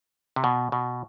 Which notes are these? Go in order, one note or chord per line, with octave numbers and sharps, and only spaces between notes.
C3
B2
B2